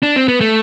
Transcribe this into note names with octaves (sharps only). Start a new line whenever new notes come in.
D4
C4
B3
A3